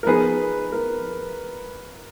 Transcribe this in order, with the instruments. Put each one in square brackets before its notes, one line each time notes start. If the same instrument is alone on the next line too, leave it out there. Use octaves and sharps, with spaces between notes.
[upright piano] A#4
[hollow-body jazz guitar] F3 B3 D#4 G#4 [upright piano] B4
[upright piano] A#4